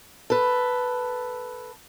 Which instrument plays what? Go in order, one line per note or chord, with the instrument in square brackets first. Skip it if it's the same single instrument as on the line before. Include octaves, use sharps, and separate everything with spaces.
[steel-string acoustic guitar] A4 B4